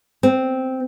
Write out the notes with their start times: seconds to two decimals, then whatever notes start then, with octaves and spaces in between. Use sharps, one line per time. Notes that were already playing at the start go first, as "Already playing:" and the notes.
0.23 C4